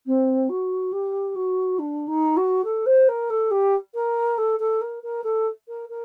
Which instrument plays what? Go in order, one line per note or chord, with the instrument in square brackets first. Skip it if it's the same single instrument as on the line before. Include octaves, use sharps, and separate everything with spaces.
[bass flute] C4
F#4
G4
F#4
D4
D#4
F#4
A4
C5
A#4
A4
G4
A#4
A4
A4
A#4
A#4
A4
A#4
A#4